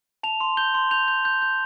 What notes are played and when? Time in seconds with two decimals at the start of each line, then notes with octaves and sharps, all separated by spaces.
0.23 A5 F7
0.40 C6
0.57 G6 G7
0.74 C6
0.91 G6 F7
1.08 G6
1.25 G6
1.42 G6